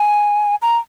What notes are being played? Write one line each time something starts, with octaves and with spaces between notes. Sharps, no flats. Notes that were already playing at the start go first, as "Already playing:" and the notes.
Already playing: G#5
A#5